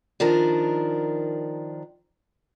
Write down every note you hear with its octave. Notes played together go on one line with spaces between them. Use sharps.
D#3 F3 D4 A#4